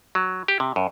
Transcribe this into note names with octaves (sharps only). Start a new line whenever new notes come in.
F#3
G4
C3
F#2